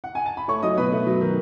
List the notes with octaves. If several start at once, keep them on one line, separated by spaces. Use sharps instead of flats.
F#5
G#5
A5
B5
A3 C#5 C#6
F#3 D#5 D#6
B2 B4 B5
A3
F#3
D#3